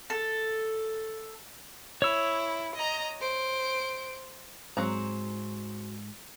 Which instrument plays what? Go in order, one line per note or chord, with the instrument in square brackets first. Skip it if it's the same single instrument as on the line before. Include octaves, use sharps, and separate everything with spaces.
[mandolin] A4
[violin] E4 [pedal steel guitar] C#5 E6
[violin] D#5 A#5
C5 D7
[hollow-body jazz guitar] G#2 [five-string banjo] F#3 C4 A#5